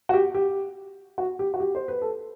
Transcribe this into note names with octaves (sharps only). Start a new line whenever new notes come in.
F#4
G4
G4
F#4
G4
F#4
G4
C5
B4
A4